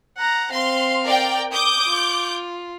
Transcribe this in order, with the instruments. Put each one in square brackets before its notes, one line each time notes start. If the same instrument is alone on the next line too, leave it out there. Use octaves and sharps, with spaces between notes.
[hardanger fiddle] F#5 A#5
[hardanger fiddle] C4 F5 [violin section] C6
[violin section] A#4 D5 G5
[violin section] D6 G6 [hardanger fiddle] D#6
[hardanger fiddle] F4